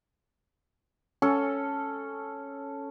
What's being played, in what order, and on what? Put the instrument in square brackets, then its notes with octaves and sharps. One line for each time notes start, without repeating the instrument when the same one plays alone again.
[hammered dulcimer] C#4 A4